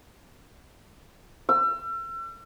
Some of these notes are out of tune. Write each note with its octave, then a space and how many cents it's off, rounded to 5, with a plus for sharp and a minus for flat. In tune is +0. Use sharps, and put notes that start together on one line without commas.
E6 +40